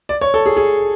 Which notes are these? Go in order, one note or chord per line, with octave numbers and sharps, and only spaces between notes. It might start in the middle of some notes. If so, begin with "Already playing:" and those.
D5
C#5
A4
G#4
G#4